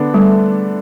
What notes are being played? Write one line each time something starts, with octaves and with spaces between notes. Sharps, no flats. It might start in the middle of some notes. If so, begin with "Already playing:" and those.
Already playing: D3 B3 D4
G3 A3